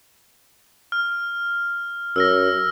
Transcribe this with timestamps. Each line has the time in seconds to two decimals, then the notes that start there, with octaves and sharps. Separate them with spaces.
0.92 F6
2.16 F#2 E6 F6 A#6